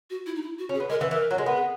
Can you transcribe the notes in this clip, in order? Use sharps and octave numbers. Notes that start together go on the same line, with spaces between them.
F#4
E4
D#4
E4
F#4
C#4
G#4
B3
G#3 A#4
E3 B4
E3 A#4
F#3
G#3
B3 A#4
G#4